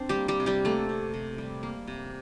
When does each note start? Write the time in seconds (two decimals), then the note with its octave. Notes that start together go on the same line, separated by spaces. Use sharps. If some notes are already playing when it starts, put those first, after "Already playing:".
Already playing: C4 D4 C5
0.09 G3 G4
0.16 A#3
0.28 G3 G4
0.40 C3
0.46 G3 G4
0.65 A3 A#3 A4
0.89 C3
1.14 C3
1.38 G3
1.63 A#3
1.88 C3